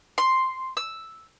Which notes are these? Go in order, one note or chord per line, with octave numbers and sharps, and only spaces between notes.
C6
E6